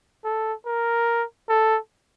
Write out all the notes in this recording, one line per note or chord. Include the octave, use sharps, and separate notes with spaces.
A4
A#4
A4